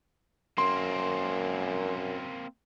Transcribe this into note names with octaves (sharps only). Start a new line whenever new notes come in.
F#2 A#3 C4 C6